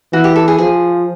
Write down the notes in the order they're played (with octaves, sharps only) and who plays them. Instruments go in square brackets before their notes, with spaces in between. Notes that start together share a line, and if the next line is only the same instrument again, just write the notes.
[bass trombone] E3 [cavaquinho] F#4
[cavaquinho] G4
A4
G#4
[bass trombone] F3 [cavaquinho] G#4